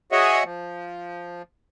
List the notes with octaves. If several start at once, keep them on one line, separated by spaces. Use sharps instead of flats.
F#4 G#4 C#5 D#5 E5 F#5
F3